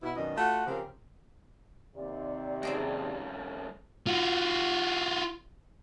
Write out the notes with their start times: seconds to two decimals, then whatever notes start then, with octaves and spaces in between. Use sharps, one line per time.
0.03 B2 E4
0.15 F#2 B2 D#3 D4 D#5
0.36 A3 F4 F#4 F#5
0.66 C#3 F3 C4 G4 A#4
1.96 D#2 C3 D5
2.63 G2 C#3 C4 G#4 A#4
4.07 F4 F#4